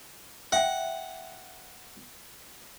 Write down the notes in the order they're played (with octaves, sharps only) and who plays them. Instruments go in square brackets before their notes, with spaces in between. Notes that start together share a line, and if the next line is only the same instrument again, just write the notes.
[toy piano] E5 G5 [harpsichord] F#5